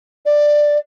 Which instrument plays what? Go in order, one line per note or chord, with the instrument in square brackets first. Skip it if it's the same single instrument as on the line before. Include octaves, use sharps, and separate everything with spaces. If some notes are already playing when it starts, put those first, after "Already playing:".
[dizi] D5